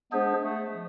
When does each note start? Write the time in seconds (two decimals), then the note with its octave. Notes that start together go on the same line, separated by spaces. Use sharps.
0.12 G#3 B3 D4 G#4 C5
0.42 A3
0.73 F3